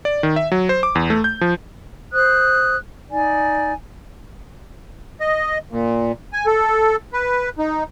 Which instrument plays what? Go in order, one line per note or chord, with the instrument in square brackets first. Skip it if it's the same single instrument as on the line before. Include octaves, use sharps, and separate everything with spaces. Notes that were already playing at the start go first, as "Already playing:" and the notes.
[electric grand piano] D5
D#3
E5
F#3
C5
D6
E2
A3
G6
F3
[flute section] C5 D#6 F#6
D#4 D5 G#5
[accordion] D#5
A#2
G#5
A4
B4
D#4